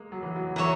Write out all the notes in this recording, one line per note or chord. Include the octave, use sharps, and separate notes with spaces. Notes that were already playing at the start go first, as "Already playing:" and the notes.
Already playing: G#3 A#3
F#3
E3
F#3
E3 C#5 E5 A#5